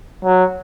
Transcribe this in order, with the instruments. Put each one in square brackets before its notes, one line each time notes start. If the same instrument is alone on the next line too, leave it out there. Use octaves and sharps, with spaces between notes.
[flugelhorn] F#3